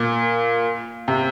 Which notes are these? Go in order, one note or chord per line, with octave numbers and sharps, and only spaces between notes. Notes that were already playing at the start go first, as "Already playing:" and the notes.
Already playing: A#2
C3